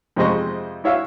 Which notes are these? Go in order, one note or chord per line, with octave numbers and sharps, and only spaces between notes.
F2 C3 G#3 C5 D#5 C#6
E4 F#4 C#5 E5 F5